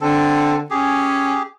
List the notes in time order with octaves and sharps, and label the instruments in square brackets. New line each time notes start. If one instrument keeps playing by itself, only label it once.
[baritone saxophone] D3 [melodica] C4 A4
[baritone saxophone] C#4 [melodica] G4 G#4